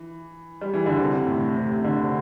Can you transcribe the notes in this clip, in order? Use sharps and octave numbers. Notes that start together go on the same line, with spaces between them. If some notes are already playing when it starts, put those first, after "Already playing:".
Already playing: E3
G3
E3
D3
C3
A2
C3
D3
C3